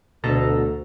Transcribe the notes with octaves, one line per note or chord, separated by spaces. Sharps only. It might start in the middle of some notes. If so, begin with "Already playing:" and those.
D2 B2 A4 A#5